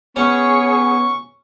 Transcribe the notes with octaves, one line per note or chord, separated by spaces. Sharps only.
B3 C#4 G#4 C#5 C#6